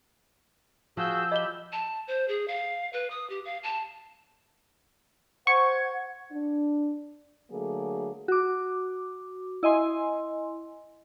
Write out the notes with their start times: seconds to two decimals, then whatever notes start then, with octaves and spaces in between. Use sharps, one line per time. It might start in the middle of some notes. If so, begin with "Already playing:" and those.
0.97 F3 F#4 G#4 E6 G6
1.32 G4 D#5 B5 G7
1.72 A5
2.08 C5
2.28 G#4
2.48 F5
2.93 B4
3.10 D#6
3.30 G4
3.45 F5
3.63 A5
5.47 C5 F#5 C#6 G#6
6.32 D4
7.50 D3 F#3 A3 A#3 G#4
8.28 F#4 D6
9.63 E4 D#5 G#5 C6